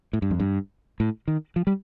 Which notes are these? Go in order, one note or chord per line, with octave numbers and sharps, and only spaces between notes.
A2
G2
F2
G2
A2
D#3
F3
G3